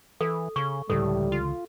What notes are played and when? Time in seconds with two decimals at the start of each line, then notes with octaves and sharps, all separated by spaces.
0.21 E3 A4
0.56 C#3 C#6
0.90 C#2 A2 D3 E3 G3 A4
1.32 F4